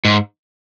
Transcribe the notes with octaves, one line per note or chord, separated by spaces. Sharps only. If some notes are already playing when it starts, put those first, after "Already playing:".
G#2